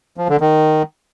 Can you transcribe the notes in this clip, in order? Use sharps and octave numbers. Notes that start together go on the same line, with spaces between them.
F3
D3
D#3